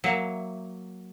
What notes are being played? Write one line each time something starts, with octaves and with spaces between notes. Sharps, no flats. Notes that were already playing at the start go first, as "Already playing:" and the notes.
F#3 A#3 E5